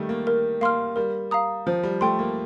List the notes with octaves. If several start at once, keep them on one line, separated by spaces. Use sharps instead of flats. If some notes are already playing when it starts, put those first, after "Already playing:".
Already playing: D#3 G3 A3
A#3
A#4
A#3 F5 C6 F6
G3 A#4
F5 A#5 D#6
F3 C5
G3
A3 G5 C6
A#3